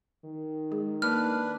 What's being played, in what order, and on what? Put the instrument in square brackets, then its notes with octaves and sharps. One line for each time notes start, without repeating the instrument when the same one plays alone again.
[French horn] D#3
[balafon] G#3 G#4
[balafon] A#3 [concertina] D4 B4 [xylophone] F6